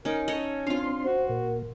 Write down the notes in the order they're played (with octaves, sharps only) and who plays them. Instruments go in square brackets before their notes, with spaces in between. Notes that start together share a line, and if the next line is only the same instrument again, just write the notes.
[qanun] C#4 D#4 [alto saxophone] A#4
[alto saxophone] C#4 [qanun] A4 C#5 D#5
[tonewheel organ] C4 D4 C6 [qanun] F4 F5
[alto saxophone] F#4 [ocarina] C5
[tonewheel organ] A#2 [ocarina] A#4